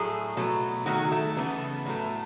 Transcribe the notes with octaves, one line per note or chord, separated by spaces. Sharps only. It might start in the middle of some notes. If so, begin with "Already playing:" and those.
Already playing: A2 F#3 A3 G#4
B2 F#3 A3
D#3 F#3 A3 F#4
A3
C#3 E3 A3 B3
A2 F#3 A3